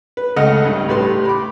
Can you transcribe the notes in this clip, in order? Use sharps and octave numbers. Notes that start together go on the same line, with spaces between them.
B4
C#2 A3 D#5 F#5 F6
G2
A2 G3 B4 C6
B5 D6